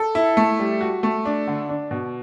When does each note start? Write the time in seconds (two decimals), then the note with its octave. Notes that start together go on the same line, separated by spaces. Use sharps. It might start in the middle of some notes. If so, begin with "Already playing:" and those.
Already playing: A4
0.15 E4
0.37 A3
0.59 G3
0.81 F#4
1.03 A3
1.25 D4
1.47 D3
1.69 D4
1.91 B2